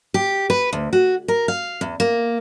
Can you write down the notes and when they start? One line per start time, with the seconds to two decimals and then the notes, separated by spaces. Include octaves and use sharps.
0.14 G4
0.50 B4
0.73 D2
0.93 F#4
1.28 A#4
1.48 F5
1.81 E2
2.00 A#3